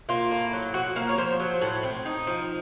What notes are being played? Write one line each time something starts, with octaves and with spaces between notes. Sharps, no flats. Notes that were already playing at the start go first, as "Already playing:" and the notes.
A#3 F4
A2
F#3
F3 F#4
A#3 F5
C#5
F3 C5
F#3
A2
C4
D#4
F3